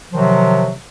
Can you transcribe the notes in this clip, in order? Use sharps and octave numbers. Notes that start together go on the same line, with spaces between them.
C3 D#3 F3 F#3